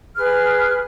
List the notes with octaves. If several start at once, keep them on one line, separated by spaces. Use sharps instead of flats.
G#4 B4 F6